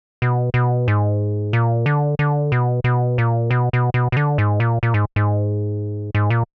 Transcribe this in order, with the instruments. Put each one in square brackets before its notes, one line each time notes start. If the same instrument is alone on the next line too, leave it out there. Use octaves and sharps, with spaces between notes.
[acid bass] B2
B2
G#2
A#2
D3
D3
B2
B2
A#2
B2
B2
B2
B2
D3
G#2
A#2
A#2
G#2
G#2
G#2
A#2